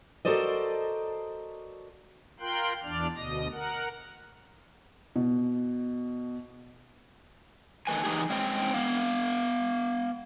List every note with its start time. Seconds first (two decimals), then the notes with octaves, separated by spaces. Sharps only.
0.25 F#4 A4 A#4 C5 D5 D#5
2.40 F4 A#4 G5 C6 F#6
2.83 E2 D4 D5 F6
3.16 D2 B2 D#5 A#6
3.52 A#4 F#5
5.16 B2
7.87 D#3 A3 B4 G#5
8.04 E3 D#4 G4 G#4
8.30 G#3 C4 C#4 C5 G5
8.74 B3 F5